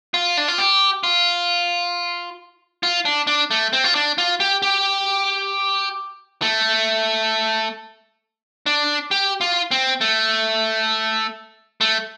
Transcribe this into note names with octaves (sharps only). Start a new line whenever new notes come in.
F4
D4
F4
G4
F4
F4
D4
D4
A3
C4
F4
D4
F4
G4
G4
A3
D4
G4
F4
C4
A3
A3